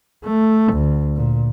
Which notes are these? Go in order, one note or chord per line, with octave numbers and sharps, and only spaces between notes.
A3
D2
A#2